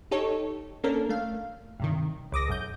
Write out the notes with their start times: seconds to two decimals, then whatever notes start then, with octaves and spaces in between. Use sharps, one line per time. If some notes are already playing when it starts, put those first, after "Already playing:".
0.11 D#4 G4 A4 C#5
0.83 A#3 C#4 D4 A4 A#4
1.09 A3 F5
1.80 G2 C3 D#3
2.32 C#2 D6 D#6 A#6
2.48 B1 F#2 G6